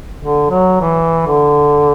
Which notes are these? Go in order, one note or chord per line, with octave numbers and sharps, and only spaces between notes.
D3
F#3
E3
D3